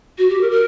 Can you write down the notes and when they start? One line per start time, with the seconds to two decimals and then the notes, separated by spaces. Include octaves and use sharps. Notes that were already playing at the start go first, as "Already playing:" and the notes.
0.18 F#4
0.29 G4
0.40 A#4
0.51 A#4